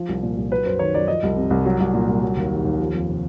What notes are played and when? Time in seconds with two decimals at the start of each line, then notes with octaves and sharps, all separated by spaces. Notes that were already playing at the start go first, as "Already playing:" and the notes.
Already playing: F3
0.09 C2
0.23 A#2
0.37 C2
0.51 F#3 B4
0.65 F#2 C5
0.79 D#3 C#5
0.94 F#2 D5
1.08 F3 D#5
1.23 C2
1.36 C3
1.50 C2
1.65 F#3
1.80 C2
1.94 A#2
2.09 C2
2.22 F#3
2.37 D#2
2.50 D#3
2.65 D#2
2.80 F3
2.94 F2
3.08 C3